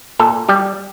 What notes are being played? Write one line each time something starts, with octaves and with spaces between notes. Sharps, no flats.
A#2 A4
G3 G4